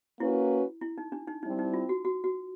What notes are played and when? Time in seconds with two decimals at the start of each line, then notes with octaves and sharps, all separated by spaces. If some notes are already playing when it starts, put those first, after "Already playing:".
0.20 A#3 C#4 E4 F#4 B4
0.81 E4
0.98 D#4
1.12 D4
1.28 D#4
1.43 G3 C4 D#4 E4
1.59 D#4
1.74 F4
1.89 F#4
2.05 F#4
2.24 F#4